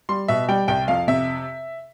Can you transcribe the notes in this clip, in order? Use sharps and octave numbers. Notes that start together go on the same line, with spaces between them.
G3 C6
B2 E5
G3 G5
C2 G5
F2 F5
C3 E5